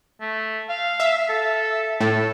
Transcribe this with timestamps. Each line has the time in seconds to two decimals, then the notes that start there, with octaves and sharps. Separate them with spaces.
0.21 A3
0.69 F5
1.00 E5
1.29 A4
2.01 A2 A4